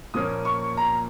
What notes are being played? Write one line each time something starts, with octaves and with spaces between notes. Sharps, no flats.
A#2 F3 A#3 C#4 D#6
C#6
A#5